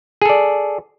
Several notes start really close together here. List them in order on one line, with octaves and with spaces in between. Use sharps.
G#4 A4 D5